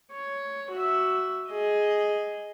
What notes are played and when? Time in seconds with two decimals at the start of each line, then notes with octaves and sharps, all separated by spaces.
0.12 C#5
0.71 F#4 E5
1.49 G#4 D#5